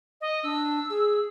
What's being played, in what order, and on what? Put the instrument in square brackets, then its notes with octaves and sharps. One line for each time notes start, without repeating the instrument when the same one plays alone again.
[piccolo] D#5
[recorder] D4 [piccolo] E6
[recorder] G#4